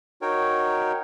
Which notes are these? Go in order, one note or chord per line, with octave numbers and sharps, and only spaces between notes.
D#4 F#4 A#4 C#5 G5